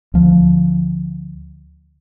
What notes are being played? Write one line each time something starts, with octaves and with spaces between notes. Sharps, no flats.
D2 F3